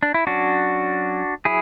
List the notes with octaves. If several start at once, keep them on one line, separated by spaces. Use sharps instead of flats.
D4
E4
F#3 C#4 D4 F#4
F#3 E4 G#4